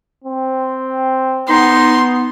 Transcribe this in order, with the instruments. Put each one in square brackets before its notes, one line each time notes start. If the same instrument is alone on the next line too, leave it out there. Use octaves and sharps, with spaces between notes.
[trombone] C4
[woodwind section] B3 [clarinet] D#4 [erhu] C6